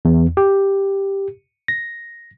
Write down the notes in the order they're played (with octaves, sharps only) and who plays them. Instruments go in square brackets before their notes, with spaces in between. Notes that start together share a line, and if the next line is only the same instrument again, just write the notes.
[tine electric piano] E2
G4
A#6